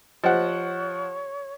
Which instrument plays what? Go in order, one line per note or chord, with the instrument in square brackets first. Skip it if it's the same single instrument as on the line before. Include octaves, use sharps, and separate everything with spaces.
[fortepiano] F3 F#5 [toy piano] G4 C5 D#5 [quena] C#5